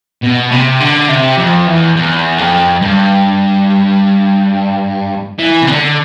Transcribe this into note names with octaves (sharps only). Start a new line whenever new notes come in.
B2
C3
D3
C3
F2
E2
E2
F2
G2
E3
C3
D3